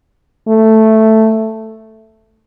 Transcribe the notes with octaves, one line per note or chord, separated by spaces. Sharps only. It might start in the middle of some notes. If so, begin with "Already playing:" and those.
A3